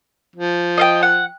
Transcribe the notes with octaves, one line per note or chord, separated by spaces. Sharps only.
F3
D#5 F5 G5
F#5